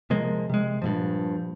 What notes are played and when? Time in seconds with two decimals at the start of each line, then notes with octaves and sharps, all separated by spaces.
0.10 C3 F3 G#3 A#3
0.49 C3 G#3
0.82 G2 A#2 F3